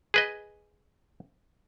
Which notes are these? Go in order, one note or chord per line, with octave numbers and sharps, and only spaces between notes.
G#4 B4 D#5